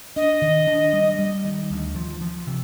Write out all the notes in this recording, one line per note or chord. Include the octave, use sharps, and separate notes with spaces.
D4 D#5
D#3
D4
G3
G3
D#3
D2
F3
F3
C3